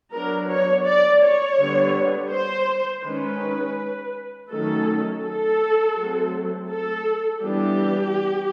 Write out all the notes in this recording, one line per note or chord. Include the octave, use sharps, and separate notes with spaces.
F#3 B3 D4 A#4
C#5
D5
C#5
D3 G3 B3 D4
C5
D#3 G#3 C#4 B4
D#3 F#3 A3 C#4 A4
A4
F#3 A3 C4
A4
E3 G3 B3 D4 G4